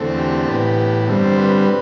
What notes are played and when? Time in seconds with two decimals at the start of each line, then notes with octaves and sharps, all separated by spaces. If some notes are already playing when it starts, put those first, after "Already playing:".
Already playing: E2 D3 A3 C4
0.18 G4
0.48 A2 E3 B3
1.09 G2 D3 G3 C4
1.24 C5
1.39 B4